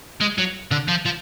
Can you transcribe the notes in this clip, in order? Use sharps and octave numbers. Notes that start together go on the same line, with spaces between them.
G#3
F#3
D3
F3
F3